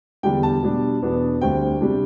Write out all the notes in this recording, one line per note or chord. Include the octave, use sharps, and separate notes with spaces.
E2 D3 G3 D4 G5
A5
B2 G3 D4
E2 B2 B3 D4
D2 D3 G3 C4 G5
C3 G3 D4